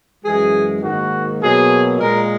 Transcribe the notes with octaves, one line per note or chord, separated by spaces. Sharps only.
F#2 E3 G#3 G#4
G#2 D#3 A#3 F#4
B2 F#3 A#3 G#4
A#2 G#3 A#4